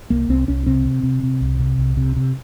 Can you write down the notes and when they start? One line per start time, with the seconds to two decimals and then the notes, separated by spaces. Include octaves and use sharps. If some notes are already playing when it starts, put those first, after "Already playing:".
0.10 C2 A#3
0.29 C2 C4
0.48 C2 C#4
0.66 C3 C4
0.86 C3
1.03 C3
1.23 C3
1.41 C2
1.60 C3
1.78 C2
1.97 C3
2.16 C3